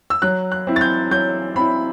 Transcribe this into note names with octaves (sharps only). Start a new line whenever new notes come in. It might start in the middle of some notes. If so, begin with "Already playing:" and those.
E6
F#3 F#6
F#6
C4 E4
A6
G6
F#3 G6
C4 E4 B5